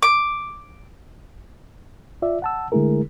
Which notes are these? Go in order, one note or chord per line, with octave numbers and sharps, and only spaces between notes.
D6
F4 D5 E5
F#5 A5 E6
D3 G#3 A3 E4 G#4 A#4